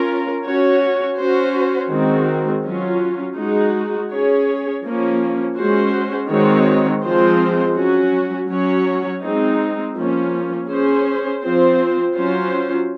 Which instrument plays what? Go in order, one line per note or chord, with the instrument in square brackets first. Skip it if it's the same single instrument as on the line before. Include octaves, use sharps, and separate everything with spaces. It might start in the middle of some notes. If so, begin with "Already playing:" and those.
Already playing: [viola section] C#4 F4 A#4
C#4 F#4 C#5
C#4 F#4 C5
D#3 G#3 C4 F#4
F#3 C#4 F4
G#3 D#4 F#4
C#4 G#4 C#5
F3 A#3 C#4
G#3 C#4 F#4 C5
D#3 G#3 C4 F#4 C#5
F3 G#3 C4 F4 C5
F#3 C#4 F#4
F#3 C#4 F#4 C#5
G#3 C4 D#4
F3 A#3 C#4
C#4 G#4 C5
F3 C4 F4 C5
F#3 C#4 F4 C5